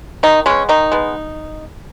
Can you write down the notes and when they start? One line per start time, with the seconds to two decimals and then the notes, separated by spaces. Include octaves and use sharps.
0.23 D#3 D#4
0.46 G#3 B3 C#4
0.69 D#3 D#4
0.92 G#3 B3